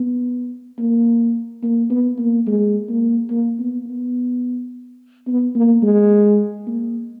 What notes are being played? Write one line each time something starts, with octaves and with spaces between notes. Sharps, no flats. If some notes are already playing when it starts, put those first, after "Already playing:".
Already playing: B3
A#3
A#3
B3
A#3
G#3
A#3
A#3
B3
B3
B3
A#3
G#3
A#3